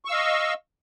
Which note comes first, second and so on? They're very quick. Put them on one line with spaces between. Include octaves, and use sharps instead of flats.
C#6 E6 F5 D#5